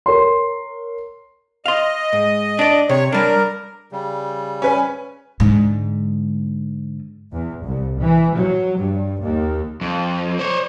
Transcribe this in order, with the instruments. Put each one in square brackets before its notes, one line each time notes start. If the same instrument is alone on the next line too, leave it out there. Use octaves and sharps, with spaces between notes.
[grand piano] A#4 C#5 C6
[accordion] D#5 [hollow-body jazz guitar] F5 C6
[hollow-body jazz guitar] G#2
D4 D5
[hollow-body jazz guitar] C3 [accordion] C#5
[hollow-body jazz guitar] G3 D4 [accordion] A#4
[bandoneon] C#3 G3
[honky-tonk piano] C#4 B4 G#5
[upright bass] G#2 D3
[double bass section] E2
C2
E3
F#3
G2
D#2
[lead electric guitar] F2
C5 C#5